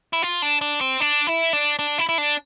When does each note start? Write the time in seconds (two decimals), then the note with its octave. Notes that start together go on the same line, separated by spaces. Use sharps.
0.13 E4
0.22 F4
0.42 D4
0.61 D4
0.81 C4
1.00 D4
1.27 E4
1.53 D4
1.79 D4
1.98 E4
2.09 E4
2.18 D4